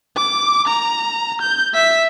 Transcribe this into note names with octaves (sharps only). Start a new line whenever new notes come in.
D6
A#5
G6
E5 B6